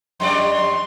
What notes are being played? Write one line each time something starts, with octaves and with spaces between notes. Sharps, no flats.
F2 G3 D5 C6